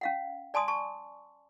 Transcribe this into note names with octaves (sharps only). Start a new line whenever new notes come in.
C#4 F5 F#5
D5 G#5 A5 C6 D#6
A5 C#6